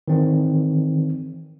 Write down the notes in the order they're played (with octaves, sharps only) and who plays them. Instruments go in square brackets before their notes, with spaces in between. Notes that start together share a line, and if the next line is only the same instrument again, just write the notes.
[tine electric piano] D#3 E3 C4